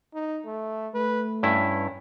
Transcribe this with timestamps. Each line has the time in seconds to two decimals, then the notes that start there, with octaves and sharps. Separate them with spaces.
0.14 D#4
0.46 A3
0.94 A3 B4
1.43 G2 C#4 E4